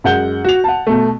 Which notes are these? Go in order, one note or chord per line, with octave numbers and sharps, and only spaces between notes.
F#2 G#3 F#5 G6 G7
F#4 F7
F#5 A5
B2 A3